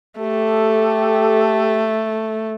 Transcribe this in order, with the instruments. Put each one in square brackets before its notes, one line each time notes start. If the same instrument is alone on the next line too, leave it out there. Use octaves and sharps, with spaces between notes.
[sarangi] A3 [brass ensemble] G4 A4